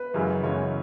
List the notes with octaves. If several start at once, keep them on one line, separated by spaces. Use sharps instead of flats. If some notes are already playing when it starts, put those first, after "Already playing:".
Already playing: B4
F#2 C#3 E3 G#3
F#2 C#3 E3 G#3 C#5